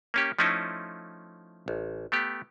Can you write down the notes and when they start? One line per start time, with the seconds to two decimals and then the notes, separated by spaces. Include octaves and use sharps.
0.14 A#3 C#4 G4
0.39 F3 A3 C#4 D#4 E4
1.68 A1
2.12 A3 B3 G4